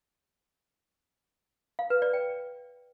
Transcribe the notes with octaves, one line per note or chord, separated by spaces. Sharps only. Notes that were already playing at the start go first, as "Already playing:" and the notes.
F5
B4
D5
G5